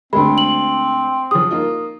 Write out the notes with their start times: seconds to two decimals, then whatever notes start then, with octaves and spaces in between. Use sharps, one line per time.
0.13 D2 G#3 C4 B5
0.38 F#7
1.31 F3 G#4 D#6
1.51 A#3 D#4 F4